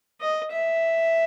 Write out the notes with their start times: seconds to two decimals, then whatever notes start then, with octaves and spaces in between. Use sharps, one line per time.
0.21 D#5
0.52 E5